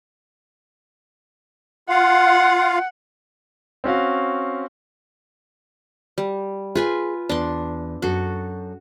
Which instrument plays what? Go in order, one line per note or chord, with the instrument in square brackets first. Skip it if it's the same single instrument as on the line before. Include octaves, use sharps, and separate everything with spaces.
[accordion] F4 F5 [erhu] F#5
[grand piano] C4 C#4 F#4 F5
[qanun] G3
[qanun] F4 B4 G#5 [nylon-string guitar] G#4
[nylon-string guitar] E2 [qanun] D4 C6
[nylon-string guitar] F#2 A4 [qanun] F#4